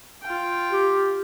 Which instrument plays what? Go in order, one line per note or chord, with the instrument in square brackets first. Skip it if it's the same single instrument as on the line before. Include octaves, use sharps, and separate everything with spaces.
[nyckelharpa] F4 G5
[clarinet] G4